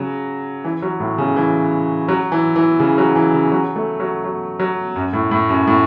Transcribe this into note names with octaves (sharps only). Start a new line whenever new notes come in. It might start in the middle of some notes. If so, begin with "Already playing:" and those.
Already playing: C#3 F#3
E3
F#3
A2
C#3
E3
F#3
E3
E3
C#3
F#3
E3
C#3
F#3
A3
F#3
F#3
F#3
F#2
A2
A2
F#2
A2